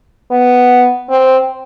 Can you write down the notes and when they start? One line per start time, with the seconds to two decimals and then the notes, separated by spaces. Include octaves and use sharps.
0.31 B3
1.10 C4